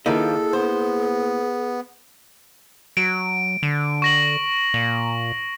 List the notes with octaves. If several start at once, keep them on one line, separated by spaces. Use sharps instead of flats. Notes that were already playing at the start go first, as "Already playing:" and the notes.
D#3 F3 A#3 E4 G#4 A4 D#5
B3 C5
F#3 D7
D3
C#6 A#6 F#7
A#2